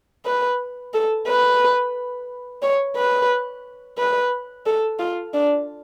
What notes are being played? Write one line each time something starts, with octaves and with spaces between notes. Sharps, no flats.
B4
A4
B4
C#5
B4
B4
A4
F4
D4